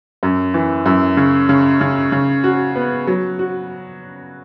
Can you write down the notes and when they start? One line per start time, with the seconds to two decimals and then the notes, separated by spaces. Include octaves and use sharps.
0.23 F#2
0.54 E3
0.86 F#2
1.17 C#3
1.49 C#3
1.81 C#3
2.12 C#3
2.44 F#4
2.76 B3
3.07 F#3
3.39 F#4